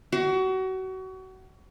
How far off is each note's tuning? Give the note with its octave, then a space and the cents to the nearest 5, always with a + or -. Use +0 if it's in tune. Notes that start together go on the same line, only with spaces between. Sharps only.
F#4 +30